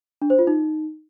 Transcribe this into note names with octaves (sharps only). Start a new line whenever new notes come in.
D4
C5
F4
D#4